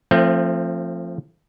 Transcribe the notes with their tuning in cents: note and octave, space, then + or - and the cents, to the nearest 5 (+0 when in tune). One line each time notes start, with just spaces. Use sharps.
F3 -10 A3 +25 C4 +25